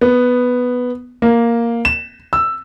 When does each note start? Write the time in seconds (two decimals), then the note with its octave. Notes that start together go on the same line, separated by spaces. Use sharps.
0.01 B3
1.22 A#3
1.85 E7
2.33 E6